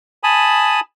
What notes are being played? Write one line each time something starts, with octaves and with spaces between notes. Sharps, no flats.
G#5 A5 B5 D#6